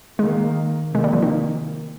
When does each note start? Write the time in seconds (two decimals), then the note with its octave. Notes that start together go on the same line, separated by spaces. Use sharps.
0.19 D#3 G#3 A#3
0.94 C3 D#3 G#3 A#3
1.04 G3
1.13 F3
1.22 D#3